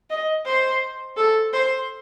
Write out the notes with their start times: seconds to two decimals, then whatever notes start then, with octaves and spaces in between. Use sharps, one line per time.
0.10 D#5
0.46 C5
1.17 A4
1.53 C5